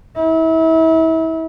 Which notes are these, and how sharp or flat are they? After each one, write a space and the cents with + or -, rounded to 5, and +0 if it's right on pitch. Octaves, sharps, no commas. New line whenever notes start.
E4 -35